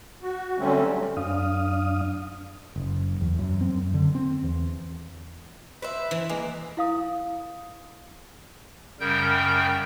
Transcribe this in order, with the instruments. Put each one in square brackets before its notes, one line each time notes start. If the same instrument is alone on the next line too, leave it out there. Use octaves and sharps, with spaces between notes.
[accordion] F#4
D3 F#3 G3 A3 C4 C#4
[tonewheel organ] F#2 D4 F5 D#6
[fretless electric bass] F#1
E2
F#2
C4
F#2
D3
C4
E2
[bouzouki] B4 C5 E5
[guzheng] E3
[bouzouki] G#3 [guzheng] A#3
[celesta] E4 F5 D#6
[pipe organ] F#2 C#3 G3 A#4 G5 G6